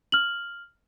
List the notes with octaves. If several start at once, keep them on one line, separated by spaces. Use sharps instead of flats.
F6 F#7